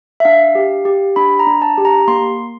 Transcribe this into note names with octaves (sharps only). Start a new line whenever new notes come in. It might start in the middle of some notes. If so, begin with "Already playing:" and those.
E5
D4 F5
G4
G4
D4 B5
A#5
D4
A5
G4
A#5
A#3 C6